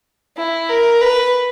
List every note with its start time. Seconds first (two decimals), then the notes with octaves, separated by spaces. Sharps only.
0.37 E4
0.69 A#4
1.01 B4